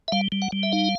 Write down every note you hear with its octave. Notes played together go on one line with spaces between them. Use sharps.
E5
G3 F5
G3
F#5
G3
E5
D#4 F5